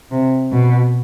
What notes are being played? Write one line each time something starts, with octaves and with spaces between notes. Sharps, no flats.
C3
B2